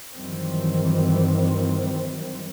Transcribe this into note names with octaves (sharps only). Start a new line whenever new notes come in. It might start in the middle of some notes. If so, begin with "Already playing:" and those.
G2 D#3 E3 F#3 G3 C4